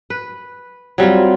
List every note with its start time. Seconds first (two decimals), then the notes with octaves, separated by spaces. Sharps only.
0.10 B4
0.98 F#3 G3 C4 F4